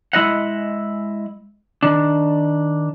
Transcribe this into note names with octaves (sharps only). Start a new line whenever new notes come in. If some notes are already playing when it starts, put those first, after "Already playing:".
G#3 E4 D#5 F#5
D#3 D4